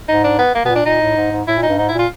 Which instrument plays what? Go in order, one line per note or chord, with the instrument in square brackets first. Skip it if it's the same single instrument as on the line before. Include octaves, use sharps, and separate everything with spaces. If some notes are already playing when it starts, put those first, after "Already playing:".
[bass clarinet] G#2 [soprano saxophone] D#4
[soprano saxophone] D4
B3
A#3
[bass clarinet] B2 [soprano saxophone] B3
[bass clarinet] A#2
[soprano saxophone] D4
[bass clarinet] A#2 [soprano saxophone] D#4
[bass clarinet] A2
G#2
G#2
[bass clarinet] A2 [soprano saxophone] E4
[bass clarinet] A#2
[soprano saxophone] D#4
[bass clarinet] G2
[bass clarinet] G#2 [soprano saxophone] D#4
[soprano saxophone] E4
[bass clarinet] A#2 [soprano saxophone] F4